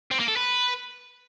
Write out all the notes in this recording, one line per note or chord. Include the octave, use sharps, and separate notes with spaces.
C4
A#3
A4
B4